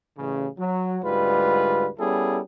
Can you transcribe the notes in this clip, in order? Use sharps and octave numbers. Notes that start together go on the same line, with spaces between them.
A1 C#3
F#3
D2 G#2 G3 F4 B4
G3 B3 C#4 E4 G#4 A4